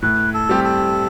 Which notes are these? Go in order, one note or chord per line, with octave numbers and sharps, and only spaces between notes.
A2 B4
A4
G3 C4 G4
A4